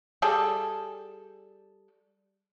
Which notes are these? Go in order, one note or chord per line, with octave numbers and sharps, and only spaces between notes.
G3 G#4 A4